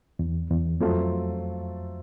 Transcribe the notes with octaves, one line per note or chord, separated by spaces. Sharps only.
E2
E2
F2 F#3 A3 C4 F4 A4